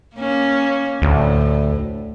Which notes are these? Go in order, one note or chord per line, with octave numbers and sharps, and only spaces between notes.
A#3 C#4
D2 A2